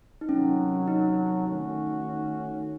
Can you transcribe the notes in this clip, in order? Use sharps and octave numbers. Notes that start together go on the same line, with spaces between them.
D#4
C3 D#3 F#3 C#4
D#4
D#3 A3 C#4 F#4